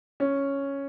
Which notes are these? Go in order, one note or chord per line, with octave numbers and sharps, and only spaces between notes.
C#4